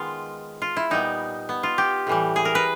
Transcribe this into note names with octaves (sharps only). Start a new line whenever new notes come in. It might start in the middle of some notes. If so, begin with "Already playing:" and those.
Already playing: D#3 G#3 B3 F4
F4
E4
A#2 G3 B3 D#4
B3
F4
G4
A2 E3 G3
G#4
A#4
B4